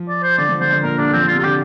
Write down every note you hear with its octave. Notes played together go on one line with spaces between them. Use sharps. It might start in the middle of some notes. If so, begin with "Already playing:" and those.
Already playing: F3
D5
C5
D3 D5
F3
D3 C5
D3
A#2 A#4
D3 D4
F3 C4
D3 F4
C3 F4
D3 G4